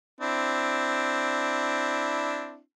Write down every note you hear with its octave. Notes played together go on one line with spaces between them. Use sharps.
C4 D4 E4